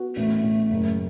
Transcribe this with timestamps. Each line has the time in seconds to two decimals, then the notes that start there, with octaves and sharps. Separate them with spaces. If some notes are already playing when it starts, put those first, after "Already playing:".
Already playing: B3 F#4
0.16 A1 A3
0.43 A1
0.70 F#1